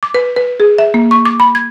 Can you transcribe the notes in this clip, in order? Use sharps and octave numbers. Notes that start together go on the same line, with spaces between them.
D6
B4
B4
G#4
E5
A#3
C#6
D6
B5
G#6